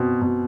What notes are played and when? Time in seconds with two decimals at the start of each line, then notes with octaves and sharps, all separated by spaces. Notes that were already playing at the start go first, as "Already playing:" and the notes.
Already playing: B2 C4
0.22 B2